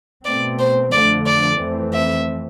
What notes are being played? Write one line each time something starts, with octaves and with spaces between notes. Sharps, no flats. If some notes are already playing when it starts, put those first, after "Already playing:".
B2 A3 C4 D5
C5
F2 D3 F3 A3 D5
D5
F2 E3 A3 C4
E5